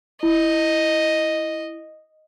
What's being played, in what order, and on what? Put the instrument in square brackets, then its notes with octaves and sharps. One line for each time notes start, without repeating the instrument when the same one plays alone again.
[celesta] E4 [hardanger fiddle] D#5